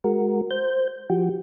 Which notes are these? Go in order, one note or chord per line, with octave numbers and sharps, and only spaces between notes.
G#3 F#4 A#4
C5 G6
F3 F#4 G4